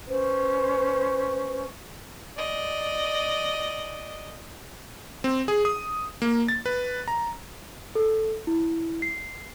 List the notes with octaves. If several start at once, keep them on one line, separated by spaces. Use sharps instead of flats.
C#4 B4 C5
D5 D#5
C4
G#4
D#6
A#3
A6
B4
A#5
A4
E4
C7